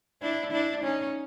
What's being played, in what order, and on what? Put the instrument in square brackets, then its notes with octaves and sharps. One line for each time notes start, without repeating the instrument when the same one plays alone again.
[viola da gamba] D4 E4
D4 E4
C#4 D#4